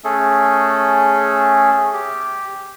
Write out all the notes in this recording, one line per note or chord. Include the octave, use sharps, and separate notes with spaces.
A3 C#4 G#4 A4
G4